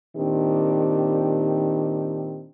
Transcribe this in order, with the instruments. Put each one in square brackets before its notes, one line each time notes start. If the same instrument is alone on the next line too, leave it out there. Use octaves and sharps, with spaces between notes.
[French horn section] A#2 D#3 C4 D4 G4